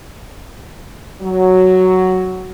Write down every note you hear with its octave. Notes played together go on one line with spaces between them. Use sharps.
F#3